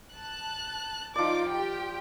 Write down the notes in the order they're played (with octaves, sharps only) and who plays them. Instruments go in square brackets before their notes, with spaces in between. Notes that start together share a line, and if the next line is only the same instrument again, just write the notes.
[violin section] A5 F#6
[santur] F3 D5 [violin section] D#4 F4 D6
[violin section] G4 G5